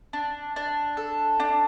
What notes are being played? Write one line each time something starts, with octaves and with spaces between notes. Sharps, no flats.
D4
D4
A4
D4